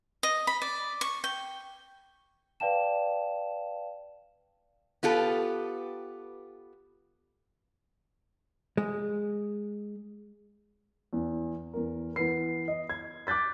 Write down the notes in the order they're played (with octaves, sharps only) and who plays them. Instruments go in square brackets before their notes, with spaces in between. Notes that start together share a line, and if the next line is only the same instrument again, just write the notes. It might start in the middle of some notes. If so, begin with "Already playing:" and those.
[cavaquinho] D#5
B5
D5
C#6
G5
[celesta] B4 D5 F5 G5 A5 E7
[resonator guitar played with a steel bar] B3 F4 G4 A4 B4
[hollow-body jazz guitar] G#3
[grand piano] E2
E2 A#4
E3 B3 C7
D#5
G#6
D6 F#6 G6 A6 B6